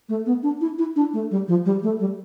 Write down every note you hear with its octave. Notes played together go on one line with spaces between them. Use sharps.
A3
B3
D4
E4
E4
D4
A3
G3
F3
G3
A3
G3